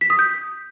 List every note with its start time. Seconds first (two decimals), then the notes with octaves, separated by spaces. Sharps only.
0.01 B6
0.10 D#6
0.19 G6